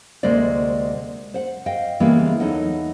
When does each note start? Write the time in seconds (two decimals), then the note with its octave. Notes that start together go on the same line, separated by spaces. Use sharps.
0.23 D2 C3 G#3 A#3 C5 D5
1.34 C5 F#5
1.66 D#5 F5 G5
2.00 C#3 E3 G3 G#3 A#3 B3
2.40 E2 F#3 D#4 A4 D#5 F#5